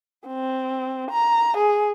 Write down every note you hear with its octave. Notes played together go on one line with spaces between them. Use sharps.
C4
A#5
G#4